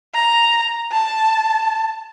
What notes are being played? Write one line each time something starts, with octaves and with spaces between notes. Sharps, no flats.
A#5
A5